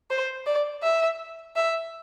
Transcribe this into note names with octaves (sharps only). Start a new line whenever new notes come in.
C5
D5
E5
E5